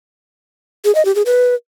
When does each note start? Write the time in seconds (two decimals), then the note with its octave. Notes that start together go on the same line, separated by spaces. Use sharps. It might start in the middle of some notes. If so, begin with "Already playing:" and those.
0.85 G#4
0.95 D#5
1.05 G4
1.15 G#4
1.26 B4